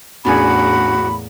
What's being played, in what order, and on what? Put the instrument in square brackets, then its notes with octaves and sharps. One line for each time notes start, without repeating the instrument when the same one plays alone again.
[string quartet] E2 A2 A#3 [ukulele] C#4 D4 G#4 [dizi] F#4 [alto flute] B5